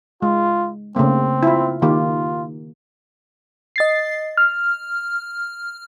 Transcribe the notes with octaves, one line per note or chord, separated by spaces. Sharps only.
G#3 F4
C#3 A3 A#3 C4
E4 F4
D#3 A#3 F4 G4
D#5 A6 C7
F6